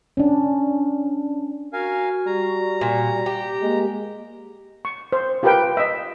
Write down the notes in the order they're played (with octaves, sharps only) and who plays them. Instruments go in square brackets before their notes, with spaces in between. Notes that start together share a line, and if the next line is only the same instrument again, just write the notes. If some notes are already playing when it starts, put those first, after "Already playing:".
[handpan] C#4 D4
[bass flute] F#4 [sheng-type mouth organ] A#4 F5 G#5
[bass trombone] G3 [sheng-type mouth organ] A#5
[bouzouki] A#2
G4
[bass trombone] G#3 [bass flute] A#3
[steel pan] C#6
C5
F4 G4 A#4 B4 F5 G5
D#5 E5